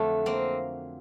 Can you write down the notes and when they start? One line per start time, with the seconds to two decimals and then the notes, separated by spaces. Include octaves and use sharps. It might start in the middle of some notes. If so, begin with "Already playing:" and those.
Already playing: F2 D3 F#3 A3
0.26 A#3 C4